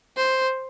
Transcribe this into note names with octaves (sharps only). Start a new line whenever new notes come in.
C5